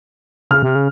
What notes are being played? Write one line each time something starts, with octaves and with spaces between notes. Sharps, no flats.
C#3 F6
C3
C#3